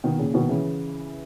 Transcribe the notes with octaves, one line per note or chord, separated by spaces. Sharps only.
B2 D#3
A#2 C#3
B2 D#3
C#3 E3